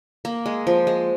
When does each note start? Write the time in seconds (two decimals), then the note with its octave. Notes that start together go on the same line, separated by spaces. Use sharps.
0.25 A#3
0.46 G#3
0.67 F3
0.87 G#3